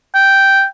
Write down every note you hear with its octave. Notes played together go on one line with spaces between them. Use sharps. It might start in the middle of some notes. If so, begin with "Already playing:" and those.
G5